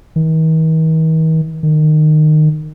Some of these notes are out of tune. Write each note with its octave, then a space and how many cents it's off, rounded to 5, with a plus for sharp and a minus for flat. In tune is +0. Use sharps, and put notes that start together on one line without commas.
D#3 +45
D#3 -20